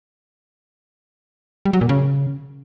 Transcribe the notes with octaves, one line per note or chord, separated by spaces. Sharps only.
G3
F#3
A#2
C#3